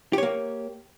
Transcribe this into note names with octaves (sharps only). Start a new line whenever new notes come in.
A#3 G4 C#5